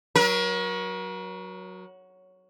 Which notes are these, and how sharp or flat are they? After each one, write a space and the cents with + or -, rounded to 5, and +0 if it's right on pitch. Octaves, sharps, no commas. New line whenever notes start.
F#3 +0 A#4 +40